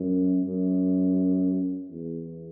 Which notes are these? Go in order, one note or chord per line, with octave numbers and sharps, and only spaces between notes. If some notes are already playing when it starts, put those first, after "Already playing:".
Already playing: F#2
F#2
E2